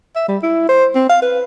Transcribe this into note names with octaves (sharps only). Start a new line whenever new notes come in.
E5
G3
E4
C5
C4
F5
B4